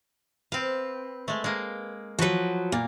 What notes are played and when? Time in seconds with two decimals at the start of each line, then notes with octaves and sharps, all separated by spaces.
0.52 C4 B4 F5
1.28 G#3 A3
1.44 G#3 A#3
2.19 F3 F#3 F#4 B4
2.72 A#2 A#3